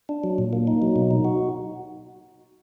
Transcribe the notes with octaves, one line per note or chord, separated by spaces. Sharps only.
D4
F#3
A#2
A#3
D#4
F#3
B2
D#4
F#4